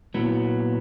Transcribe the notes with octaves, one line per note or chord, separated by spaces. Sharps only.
A#2 F#3 B3 E4